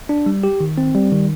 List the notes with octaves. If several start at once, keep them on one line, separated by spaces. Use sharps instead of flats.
D4
G3
G4
D#3
C4
G3
D#3